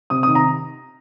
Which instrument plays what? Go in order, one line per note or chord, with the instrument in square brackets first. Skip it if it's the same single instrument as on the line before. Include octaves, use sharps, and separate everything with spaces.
[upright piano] C3 D#6
D#3 D#6
A#5